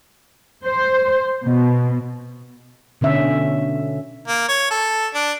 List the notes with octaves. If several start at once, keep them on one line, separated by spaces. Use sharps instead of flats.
C5
B2
B2 D3 C#4 E5
A#3
C#5
A4
D4